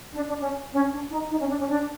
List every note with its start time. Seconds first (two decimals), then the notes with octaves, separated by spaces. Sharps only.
0.15 D4
0.28 D4
0.41 C#4
0.73 C#4
0.92 D4
1.11 D#4
1.30 D#4
1.40 C#4
1.49 D4
1.60 C#4
1.69 D4